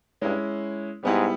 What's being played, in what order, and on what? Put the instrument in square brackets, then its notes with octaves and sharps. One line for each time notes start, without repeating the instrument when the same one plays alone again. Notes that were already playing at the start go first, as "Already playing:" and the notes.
[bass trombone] G2 [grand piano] G#3 C#4 E4
[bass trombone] G#2 [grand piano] G3 B3 E4 G4